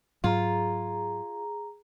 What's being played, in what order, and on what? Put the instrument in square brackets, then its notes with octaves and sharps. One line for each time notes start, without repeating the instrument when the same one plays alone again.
[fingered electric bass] G#2 F#3 [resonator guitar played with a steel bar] F4 [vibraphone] G#4 A#5